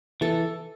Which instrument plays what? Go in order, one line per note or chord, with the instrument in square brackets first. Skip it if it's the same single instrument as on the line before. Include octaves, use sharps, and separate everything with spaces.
[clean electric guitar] E3 [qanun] A4